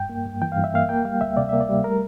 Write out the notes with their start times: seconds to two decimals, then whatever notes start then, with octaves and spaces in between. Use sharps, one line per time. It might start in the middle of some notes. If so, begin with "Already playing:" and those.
Already playing: G2 G5
0.09 A#3
0.25 G2
0.42 E3 G5
0.52 F5
0.57 G2
0.64 E5
0.74 A#3 F5
0.89 A#3 G5
1.05 G3 F5
1.21 D2 E5
1.37 C3 D5
1.49 A#3 E5
1.61 D5
1.69 G3
1.84 A3 A#4